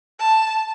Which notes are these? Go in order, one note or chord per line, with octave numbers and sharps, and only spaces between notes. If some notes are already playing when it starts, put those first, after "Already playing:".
A5